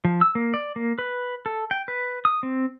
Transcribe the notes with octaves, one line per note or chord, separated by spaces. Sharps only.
F3
E6
A#3
D5
A#3
B4
A4
G5
B4
D#6
C4